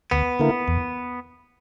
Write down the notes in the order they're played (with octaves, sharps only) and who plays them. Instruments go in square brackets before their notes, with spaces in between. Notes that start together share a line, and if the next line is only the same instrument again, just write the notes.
[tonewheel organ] D2 [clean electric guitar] B3
[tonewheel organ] D3 A#3 E4 A#4
E2